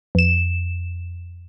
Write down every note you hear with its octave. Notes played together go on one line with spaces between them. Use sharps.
F2 E7